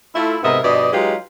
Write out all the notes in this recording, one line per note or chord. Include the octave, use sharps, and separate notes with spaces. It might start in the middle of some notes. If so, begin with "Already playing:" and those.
A3 E4 F4
G#2 C3 B3 A#4 D#5 E5
G2 B2 F3 D5 D#5
F#3 G#3 D#4 F4 G4 B4